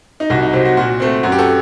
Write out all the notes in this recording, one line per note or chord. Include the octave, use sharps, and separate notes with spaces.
D#4
C2 F#4
D#4
C3 F#3 C4
F#4
A#2 F#4
A3 C4
F#2 F#4
G4
F#4 A4